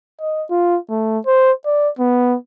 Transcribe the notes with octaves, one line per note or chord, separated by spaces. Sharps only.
D#5
F4
A3
C5
D5
B3